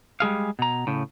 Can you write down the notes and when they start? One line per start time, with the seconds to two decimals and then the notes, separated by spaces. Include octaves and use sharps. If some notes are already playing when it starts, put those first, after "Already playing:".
0.20 G3 G#3 G#4 F5
0.59 B2 A#5
0.87 A2 C#3